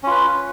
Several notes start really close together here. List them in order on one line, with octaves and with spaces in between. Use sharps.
C#4 F4 B4